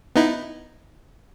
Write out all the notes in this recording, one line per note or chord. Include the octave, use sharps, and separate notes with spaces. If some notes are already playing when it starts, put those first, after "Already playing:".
B3 D#4 E4